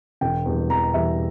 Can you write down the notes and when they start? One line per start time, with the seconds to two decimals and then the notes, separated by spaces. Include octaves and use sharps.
0.21 E1 G5
0.46 E2 E3 G3
0.70 E1 A#5
0.94 E2 E3 G3 E5